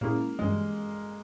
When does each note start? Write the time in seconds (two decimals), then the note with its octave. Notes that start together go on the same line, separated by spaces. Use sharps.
0.01 A#2 G#3 A#3 C#4 E4 G#4
0.39 G2 E3 G3 G#3